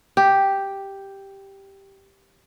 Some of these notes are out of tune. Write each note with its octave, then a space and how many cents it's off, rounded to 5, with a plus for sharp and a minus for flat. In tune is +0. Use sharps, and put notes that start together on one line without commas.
G4 +0